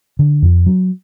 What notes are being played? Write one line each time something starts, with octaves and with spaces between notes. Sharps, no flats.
D3
F2
F#3